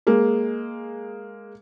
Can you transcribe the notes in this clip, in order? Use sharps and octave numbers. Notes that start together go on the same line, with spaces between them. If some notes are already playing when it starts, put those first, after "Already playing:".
G#3 A#3